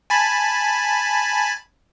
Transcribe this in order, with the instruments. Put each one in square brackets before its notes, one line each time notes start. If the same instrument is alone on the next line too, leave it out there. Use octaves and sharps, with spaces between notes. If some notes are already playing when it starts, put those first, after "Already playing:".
[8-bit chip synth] G#5 A5 B5